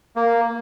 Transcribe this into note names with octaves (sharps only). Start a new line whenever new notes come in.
A#3